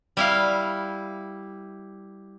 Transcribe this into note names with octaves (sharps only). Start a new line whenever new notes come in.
G3 E4 F5